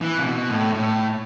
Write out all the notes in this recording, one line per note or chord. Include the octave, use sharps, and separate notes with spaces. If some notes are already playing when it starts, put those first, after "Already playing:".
E3
C3
B2
A2
A2